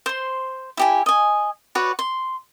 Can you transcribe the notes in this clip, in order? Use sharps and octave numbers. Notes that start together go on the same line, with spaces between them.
C5 C6
E4 G4 G#5
D#5 G#5
F#4 B4 C#5 D5
C6